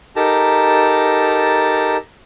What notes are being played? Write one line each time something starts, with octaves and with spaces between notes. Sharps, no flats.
D#4 G4 A4 A#4 A5 A#5